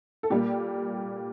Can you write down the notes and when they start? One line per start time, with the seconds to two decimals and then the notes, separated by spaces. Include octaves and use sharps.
0.23 A4
0.30 A#2 G3 A#3 G4